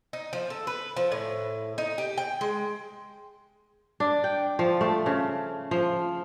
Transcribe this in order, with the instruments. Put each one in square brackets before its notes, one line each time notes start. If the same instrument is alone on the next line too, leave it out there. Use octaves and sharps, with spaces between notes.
[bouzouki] D#4
F3
A4
B4
F3
A2
D#4
G4
G5
G#3
[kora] D4
G5
F3
A3
C#3
F3